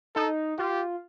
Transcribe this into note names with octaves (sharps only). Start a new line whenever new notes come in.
D#4 A4
F4 G4